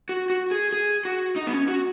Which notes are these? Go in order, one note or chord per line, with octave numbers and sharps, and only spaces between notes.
F#4
F#4
G#4
G#4
F#4
D#4
B3
C#4
F#4